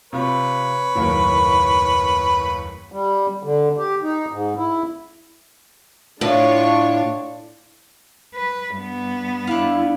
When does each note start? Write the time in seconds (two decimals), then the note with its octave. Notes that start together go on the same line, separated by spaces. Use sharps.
0.13 C3 F4 B4 C#5
0.95 F#1 D#2 A2
2.92 G3
3.43 D3
3.78 G4
4.02 D#4
4.32 G#2
4.57 E4
6.21 A2 D4 F4 C#5
8.35 B4
8.76 G2 B3
9.47 D4 E4 F5